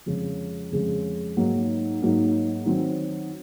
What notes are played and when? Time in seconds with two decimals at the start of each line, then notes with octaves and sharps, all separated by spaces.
0.06 F2 C#3 G#3
0.72 F2 C#3 G#3
1.37 G#2 F#3 A#3 D#4
2.01 G#2 F#3 A#3 D#4
2.66 D#3 F#3 C4